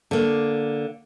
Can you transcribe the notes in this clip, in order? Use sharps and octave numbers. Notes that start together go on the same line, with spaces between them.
D3 A#3